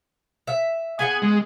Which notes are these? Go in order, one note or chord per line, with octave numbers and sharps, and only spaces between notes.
E5
B3 G#4 F#5 G#5
G#3